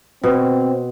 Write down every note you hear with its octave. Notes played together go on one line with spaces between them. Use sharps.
B2 C4